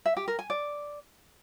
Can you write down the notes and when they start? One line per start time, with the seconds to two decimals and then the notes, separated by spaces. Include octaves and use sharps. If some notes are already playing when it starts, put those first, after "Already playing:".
0.06 E5
0.17 G4
0.28 A#4
0.39 G#5
0.50 D5